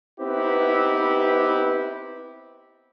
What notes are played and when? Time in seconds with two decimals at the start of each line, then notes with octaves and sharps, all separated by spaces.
0.21 B3 C4 D#4 E4 G4 B4